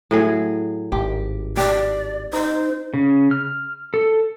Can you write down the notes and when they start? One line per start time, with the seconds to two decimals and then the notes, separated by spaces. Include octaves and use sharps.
0.11 A2 F#3 G#4
0.92 G#1 G4
1.57 G4 D5
2.33 D#4 C5
2.94 C#3
3.31 F6
3.94 A4